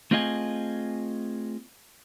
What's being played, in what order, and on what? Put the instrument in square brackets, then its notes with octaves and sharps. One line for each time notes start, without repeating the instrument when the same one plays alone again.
[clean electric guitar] A3 C4 F4 G#4 D#5 G#5